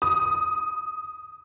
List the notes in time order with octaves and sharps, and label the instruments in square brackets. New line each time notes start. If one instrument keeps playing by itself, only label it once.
[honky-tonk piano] D#6